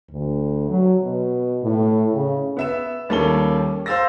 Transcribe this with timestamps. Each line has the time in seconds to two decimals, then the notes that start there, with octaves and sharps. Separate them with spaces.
0.11 D2
0.69 F#3
1.02 B2
1.63 A2
2.14 C#3
2.57 B3 E5 E7
3.09 D#2 G3 A#3 C#4 A4 G7
3.86 C5 F5 E6 A6 A#6